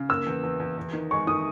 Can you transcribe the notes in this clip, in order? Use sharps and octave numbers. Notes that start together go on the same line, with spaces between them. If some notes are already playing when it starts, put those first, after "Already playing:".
Already playing: C#3
A#3 E6
E2
E2
E2
E2
D#3
G#3 C#6
D#3 D#6